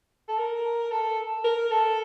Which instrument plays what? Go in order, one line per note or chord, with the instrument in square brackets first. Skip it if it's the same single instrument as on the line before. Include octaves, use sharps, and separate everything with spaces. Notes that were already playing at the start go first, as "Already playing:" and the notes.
[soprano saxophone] A4
A#4
A4
A#4
A4